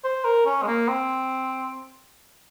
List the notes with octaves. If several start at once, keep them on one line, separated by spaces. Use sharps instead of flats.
C5
A#4
C#4
G#3
A#3
C4